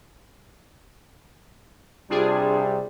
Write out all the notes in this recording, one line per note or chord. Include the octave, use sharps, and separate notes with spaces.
C3 G3 D4 F4 G#4